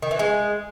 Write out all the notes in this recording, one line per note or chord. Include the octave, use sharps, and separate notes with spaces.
D#3
E3
G#3